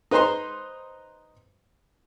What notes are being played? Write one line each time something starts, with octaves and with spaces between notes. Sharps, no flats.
D#4 B4 C5 A#5 C6